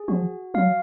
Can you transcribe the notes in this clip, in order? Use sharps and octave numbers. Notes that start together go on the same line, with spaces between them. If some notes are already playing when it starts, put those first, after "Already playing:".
Already playing: G#4
F3 F#4
F#3 F5